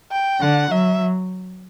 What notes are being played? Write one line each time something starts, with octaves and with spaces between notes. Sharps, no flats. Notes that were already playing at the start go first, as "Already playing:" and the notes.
G5
D3 F#5
F#3 E5